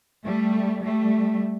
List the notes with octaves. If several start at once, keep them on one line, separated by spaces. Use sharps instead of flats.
G3 A3
G3 A3